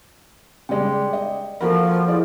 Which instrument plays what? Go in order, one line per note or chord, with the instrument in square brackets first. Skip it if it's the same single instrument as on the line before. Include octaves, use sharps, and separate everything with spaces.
[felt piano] C#3 G3 G#3 [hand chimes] D5 G5
[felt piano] D#5
[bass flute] F3 [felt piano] A#3 F#4 A#4 [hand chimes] A4 B5
[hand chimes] E4 G#4 D#5 [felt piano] D5